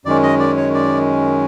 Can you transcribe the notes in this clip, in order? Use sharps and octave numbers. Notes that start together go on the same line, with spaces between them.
F#2 D#3 G#3 C#4 D5
D#5
D5
C#5
D5